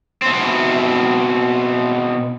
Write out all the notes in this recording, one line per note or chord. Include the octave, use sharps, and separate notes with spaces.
B2 C4